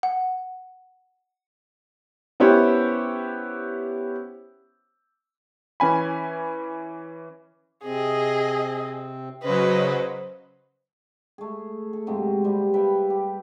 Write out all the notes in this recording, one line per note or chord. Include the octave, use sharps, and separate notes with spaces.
F#5
B3 C#4 E4 G4 C5 C#5
E3 C#4 G#5 B5
C3 C4 G#4 D#5
C#3 F#3 B4 C5 D#5
A3 G#4
A4
G#2 C3 F#3 A#3
C3 G3
B4 E5 F5 G5
G4